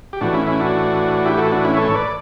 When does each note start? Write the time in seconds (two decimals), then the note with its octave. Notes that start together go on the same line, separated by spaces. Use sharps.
0.13 G4
0.21 A2 E3 D4 F#4
0.33 C#4 E4
0.47 C#4 E4
0.60 D4 F#4
1.25 E4 G4
1.38 F#4 A4
1.52 D4 F#4
1.65 C#4 E4
1.77 A4 C#5
1.94 B4 D5